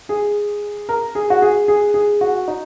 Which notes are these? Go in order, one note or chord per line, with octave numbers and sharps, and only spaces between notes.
G#4
A#4
G#4
F#4
G#4
G#4
G#4
F#4
D#4